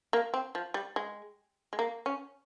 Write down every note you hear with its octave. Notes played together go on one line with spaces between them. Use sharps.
A#3
C4
F3
G3
G#3
G#3
A#3
C#4